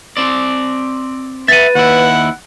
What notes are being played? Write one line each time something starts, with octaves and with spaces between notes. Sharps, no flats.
C4 D5
B4 E5 F#5 A6 D#7
D#2 E4 F#5